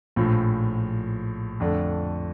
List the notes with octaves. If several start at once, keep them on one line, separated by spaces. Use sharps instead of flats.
A#1 A2 F3
F2 D3 A3 D4